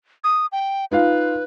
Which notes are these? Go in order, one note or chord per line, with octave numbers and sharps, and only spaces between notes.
D#6
G5
D#4 F4 B4 F5